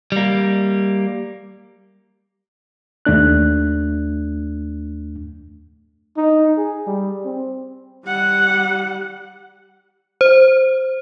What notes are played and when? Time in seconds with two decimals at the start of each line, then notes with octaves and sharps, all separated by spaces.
0.12 G3 A#3
3.05 D#2 A3 D4 F#6
6.17 D#4
6.57 G#4
6.87 G3
7.25 C4
8.06 G3 F#5
10.21 C5